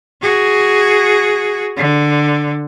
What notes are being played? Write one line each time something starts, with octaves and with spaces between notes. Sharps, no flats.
F#4 G#4
D3